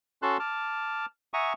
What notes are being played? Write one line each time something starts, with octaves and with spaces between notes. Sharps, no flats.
C#4 F#4 A4 A5 C6 F#6
A5 D6 F6
E5 F#5 G#5 A#5 C#6 D#6